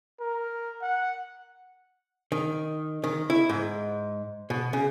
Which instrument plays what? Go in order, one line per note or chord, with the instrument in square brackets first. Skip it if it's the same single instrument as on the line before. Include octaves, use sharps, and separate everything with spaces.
[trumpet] A#4
F#5
[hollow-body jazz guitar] D#3
D#3
E4
G#2
B2
C#3